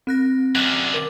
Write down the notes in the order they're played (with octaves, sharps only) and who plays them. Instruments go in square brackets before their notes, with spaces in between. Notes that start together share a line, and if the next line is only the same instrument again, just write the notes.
[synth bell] C4 F#6 A#6
[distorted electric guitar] F#2 D3 [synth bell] F6 F#6
[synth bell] A#4 D6